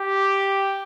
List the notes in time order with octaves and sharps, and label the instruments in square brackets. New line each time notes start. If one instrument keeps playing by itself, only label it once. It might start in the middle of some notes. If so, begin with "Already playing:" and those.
Already playing: [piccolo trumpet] G4